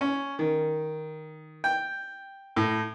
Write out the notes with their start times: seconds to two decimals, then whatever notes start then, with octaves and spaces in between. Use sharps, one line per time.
0.01 C#4
0.39 D#3
1.64 G5
2.56 A2